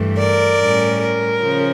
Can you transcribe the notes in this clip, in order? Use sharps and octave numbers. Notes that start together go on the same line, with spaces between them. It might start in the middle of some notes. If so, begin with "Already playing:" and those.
Already playing: G2 E3 A3
A#4 D5
A2 G3 C#4
A#4
C#3 F3 C#4